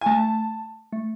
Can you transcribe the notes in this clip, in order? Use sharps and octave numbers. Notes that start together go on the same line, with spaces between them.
G#5
A3 A5
A3